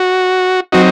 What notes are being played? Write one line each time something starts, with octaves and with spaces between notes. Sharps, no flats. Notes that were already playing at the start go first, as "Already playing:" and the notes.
Already playing: F#4
F#3 C4 D#4 F#4